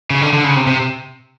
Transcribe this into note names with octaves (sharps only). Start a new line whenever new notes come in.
C#3
D3
D3
C#3
C3
C3